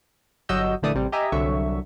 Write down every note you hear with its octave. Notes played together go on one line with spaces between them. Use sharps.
G1 F#3 F#4 D#5 E6 G6
A#1 D3 E3 A3 D5 D#6
A1 C3 G3
G4 D#5 E5 G#5 A#5
C2 D3 F#3 E5 C#6